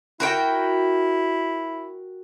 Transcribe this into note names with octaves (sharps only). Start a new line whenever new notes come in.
E4 F#4 A#4 G5